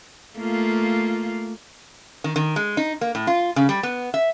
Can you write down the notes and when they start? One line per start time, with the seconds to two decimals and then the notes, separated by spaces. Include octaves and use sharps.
0.38 A3 A#3 F4
2.24 D#3
2.36 D#3
2.56 G#3
2.77 D#4
3.01 A#3
3.15 A2
3.27 F4
3.56 C#3
3.69 G3
3.83 B3
4.14 E5